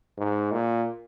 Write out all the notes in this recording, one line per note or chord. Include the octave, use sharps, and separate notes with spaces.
G#2
A#2